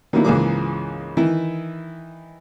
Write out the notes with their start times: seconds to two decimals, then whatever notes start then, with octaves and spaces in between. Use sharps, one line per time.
0.13 D#3 F#3 G3 A#3 B3 E4
0.24 C#2 G#2 E3 A#3 G#4 D6
1.17 D#3 E3 E4